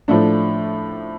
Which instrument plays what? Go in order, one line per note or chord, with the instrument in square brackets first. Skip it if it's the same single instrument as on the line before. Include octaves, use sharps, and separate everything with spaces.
[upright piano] A2 F3 A3 D4